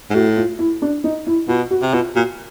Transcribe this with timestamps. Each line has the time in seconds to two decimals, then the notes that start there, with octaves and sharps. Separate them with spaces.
0.10 G#2
0.15 A2 F#4
0.37 F4
0.59 E4
0.82 D4
1.04 D#4
1.27 E4
1.48 B2 F4
1.71 F#4
1.82 C3
1.93 B2 F4
2.15 A#2 F#4